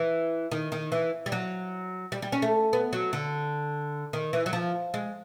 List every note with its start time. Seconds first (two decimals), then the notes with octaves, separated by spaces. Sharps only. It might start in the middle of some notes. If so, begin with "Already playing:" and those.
Already playing: E3
0.52 D#3
0.72 D#3
0.92 E3
1.26 G3
1.32 F#3
2.12 G3
2.22 G3
2.32 C#4
2.42 A3
2.73 B3
2.93 F#3
3.13 D3
4.13 D#3
4.33 E3
4.46 F#3
4.53 F3
4.94 G#3